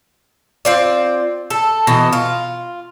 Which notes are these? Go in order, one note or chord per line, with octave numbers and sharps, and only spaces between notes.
C4 F4 D5
A4
B2 E3 D#5
F4